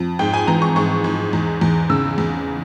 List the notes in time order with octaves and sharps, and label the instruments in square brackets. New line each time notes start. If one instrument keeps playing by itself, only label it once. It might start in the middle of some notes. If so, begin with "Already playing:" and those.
Already playing: [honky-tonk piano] F2
G#2 G5
G#5
E3 A#5
C#6
G#2 C#6
G#2
E2
E2
C#3 E6
E2